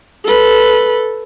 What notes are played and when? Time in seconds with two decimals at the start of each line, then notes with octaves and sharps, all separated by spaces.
0.25 A4 B4